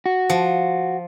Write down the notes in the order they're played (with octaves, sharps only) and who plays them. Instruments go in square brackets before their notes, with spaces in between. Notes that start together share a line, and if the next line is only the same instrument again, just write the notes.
[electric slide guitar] F#4
[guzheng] F3